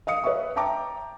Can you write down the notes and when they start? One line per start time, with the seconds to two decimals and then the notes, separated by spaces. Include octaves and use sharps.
0.07 D#5 F5 D#6 C#7
0.24 B4 C#5 D#5 E5 C#6
0.56 E5 G5 A5 A#5 D6